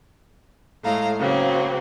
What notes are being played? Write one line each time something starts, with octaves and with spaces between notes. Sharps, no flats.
A2 G#3 A3 F5 A#5
C#3 F#3 A#3 C4